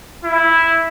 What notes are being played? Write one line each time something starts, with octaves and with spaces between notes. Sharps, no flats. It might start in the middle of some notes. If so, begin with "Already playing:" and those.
E4